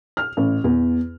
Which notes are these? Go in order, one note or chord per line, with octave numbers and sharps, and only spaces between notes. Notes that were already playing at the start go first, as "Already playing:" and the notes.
F6
A1
E2